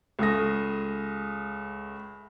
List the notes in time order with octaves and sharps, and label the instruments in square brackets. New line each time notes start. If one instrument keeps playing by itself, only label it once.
[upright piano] C#2 A3 D#6 A#6